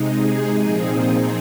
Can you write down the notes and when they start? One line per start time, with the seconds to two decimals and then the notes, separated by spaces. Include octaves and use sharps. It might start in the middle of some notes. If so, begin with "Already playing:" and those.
Already playing: C3 G#3 D#4
0.18 G#4
0.62 A#2 F3 C4 D#4 G#4
1.05 G#4